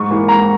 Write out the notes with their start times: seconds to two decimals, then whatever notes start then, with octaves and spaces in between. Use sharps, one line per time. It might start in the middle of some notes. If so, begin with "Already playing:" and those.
Already playing: G#2 C#6
0.10 E3 A#3
0.28 G#2 A#5